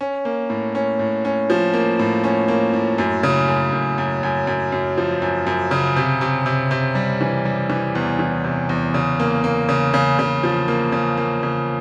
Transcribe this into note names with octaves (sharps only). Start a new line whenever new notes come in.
C#4
A#3
A2
C#4
A2
C#4
F3
A#3
A2
C#4
A#3
A2
F#2
C#3
F#2
F#2
F#2
F#2
F#2
F#2
F3
F#2
F#2
C#3
C3
C3
C3
C3
G3
E3
G3
E3
E2
E3
C3
E2
C#3
A#3
A#3
C#3
C#3
C#3
F3
A#3
C#3
A#3
C#3